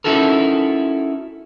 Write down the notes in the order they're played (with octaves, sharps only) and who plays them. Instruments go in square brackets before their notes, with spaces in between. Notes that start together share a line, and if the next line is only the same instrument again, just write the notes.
[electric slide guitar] C#4 D#4 E4 F#4 A4 A#4